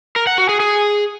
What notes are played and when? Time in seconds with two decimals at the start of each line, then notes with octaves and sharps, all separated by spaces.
0.16 A#4
0.27 F#5
0.38 F#4
0.49 G#4
0.60 G#4